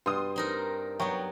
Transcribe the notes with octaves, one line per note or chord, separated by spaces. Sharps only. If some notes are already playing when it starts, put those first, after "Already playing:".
G2 C6 D#6
C4 D#4 A#4
F#3 B3 G5 A#5 C#6